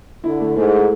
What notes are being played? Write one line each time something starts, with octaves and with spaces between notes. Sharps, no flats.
D3 E4
A3
G#2 A3